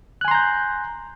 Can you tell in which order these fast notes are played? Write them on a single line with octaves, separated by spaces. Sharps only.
F#6 G#5 C6 A#5 G6